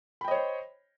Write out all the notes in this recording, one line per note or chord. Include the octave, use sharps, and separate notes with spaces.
C5 C#5 D#5 G5 B5